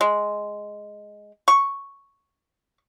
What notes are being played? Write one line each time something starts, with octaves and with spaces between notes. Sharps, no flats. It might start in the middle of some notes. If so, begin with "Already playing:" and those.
G#3
C#6